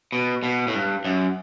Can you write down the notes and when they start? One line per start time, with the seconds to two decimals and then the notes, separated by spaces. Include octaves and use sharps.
0.12 B2
0.43 B2
0.68 A2
0.74 G2
1.05 F#2